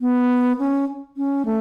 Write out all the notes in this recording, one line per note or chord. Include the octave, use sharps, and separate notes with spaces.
B3
C#4
C#4
A3